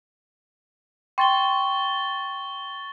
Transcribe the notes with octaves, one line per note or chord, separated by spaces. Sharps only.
G5 C6 C#6 A6 G7